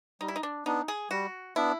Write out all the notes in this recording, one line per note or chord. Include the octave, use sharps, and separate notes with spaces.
G3 D#4
E4
D#4
D4
B3 D4 D#4
G#4
G3 F#4
B3 D4 E4